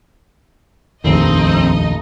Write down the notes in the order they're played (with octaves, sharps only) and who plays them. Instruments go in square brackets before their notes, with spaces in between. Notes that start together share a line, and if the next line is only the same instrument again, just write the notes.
[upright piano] F1 [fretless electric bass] A#1 D#2 [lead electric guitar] C4 [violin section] D#4 D#5